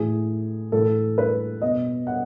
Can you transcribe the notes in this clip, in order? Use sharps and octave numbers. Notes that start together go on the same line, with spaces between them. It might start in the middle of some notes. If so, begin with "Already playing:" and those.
Already playing: A2 E3 G#4
A2 E3 A4
B4
B2 D#5
F#5